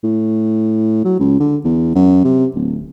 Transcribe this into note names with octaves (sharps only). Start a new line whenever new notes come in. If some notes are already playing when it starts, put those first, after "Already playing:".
A2
F#3
C#2
D3
E2
F#2
C3
D1